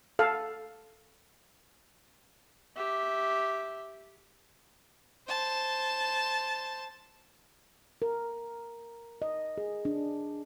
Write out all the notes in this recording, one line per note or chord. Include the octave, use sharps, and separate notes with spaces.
A4 F5
G4 E5
C5 A5
A#4
D#5
G#4
D4